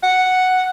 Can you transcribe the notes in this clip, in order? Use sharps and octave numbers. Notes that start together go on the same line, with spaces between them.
F#5